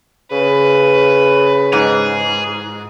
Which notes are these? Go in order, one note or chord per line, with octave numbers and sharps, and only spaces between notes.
C#3 B4
G#2 G#4